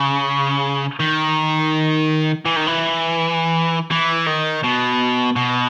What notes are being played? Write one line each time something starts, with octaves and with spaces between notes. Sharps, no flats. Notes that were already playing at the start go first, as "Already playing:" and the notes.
Already playing: C#3
D#3
E3
D#3
E3
E3
D#3
B2
B2